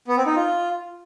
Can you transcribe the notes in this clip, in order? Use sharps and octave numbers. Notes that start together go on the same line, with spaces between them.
B3
C4
D#4
F4